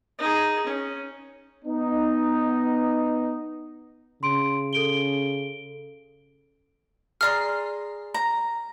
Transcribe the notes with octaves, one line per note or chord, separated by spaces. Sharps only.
D#4 G#4
C#4
B3 D#4
C#3 C6 D7
A4 D7 G7
G#4 D5 A#5 C6 F6
A#5